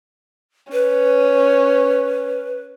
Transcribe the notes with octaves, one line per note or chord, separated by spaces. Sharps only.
C#4 B4